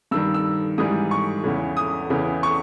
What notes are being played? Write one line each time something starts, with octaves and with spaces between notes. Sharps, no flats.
G2 D#3 G3 E6
E6
G#2 E3 G3 D#6
C#6
E2 C#3 E3
D#6
E2 C#3 E3
C#6